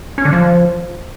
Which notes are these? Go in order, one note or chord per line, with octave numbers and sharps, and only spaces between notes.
C#4
D3
F3